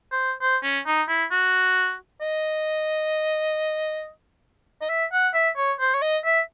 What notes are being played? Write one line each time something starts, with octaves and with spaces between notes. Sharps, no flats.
C5
C5
C#4
D#4
E4
F#4
D#5
D#5
E5
F#5
E5
C#5
C5
C#5
D#5
E5